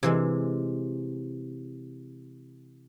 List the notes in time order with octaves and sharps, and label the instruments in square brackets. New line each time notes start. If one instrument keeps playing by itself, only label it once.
[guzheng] C3 E3 G#3